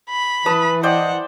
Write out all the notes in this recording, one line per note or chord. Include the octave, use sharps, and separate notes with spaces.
B5
E3 B4 A5 D#6
C5 D5 D#5 F#5 G5